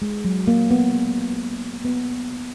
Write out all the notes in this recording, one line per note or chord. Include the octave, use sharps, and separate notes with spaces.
G#3
F#3
A#3
B3
B3